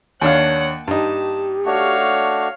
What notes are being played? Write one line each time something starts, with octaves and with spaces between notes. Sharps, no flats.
D#2 A#3 D4 C#5 F5 F#5
G2 D#4 G4 A5
A3 D4 F#4 C#5 F5